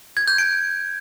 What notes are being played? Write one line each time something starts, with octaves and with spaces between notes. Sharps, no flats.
G#6
G6
D7